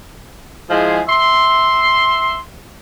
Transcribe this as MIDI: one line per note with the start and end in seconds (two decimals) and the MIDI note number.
0.70 1.01 53
0.70 1.01 56
0.70 1.01 64
0.70 1.01 68
1.08 2.35 76
1.08 2.35 84